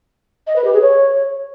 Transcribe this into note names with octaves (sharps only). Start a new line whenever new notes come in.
D#5
B4
G4
G#4
C#5